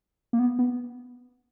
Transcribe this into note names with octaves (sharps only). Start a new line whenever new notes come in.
A#3
B3
B3